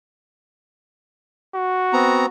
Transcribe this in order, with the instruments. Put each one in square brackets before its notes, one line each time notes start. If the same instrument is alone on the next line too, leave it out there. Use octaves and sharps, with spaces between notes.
[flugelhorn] F#4
[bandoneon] B3 C4 A#5